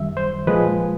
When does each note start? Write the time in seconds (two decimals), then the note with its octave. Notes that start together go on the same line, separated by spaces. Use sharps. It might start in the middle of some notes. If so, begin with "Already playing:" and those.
Already playing: F#2 D#3 G3 E5
0.17 C5
0.47 A#2 F3 G#3 B4